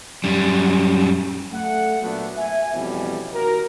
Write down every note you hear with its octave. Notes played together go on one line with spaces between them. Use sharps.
F#2 G3
A3 F#5
A#2 F#3 A3 B3 D4
E5 G#5
F2 B2 E3 G3 C#4
D#2 F#4 A#4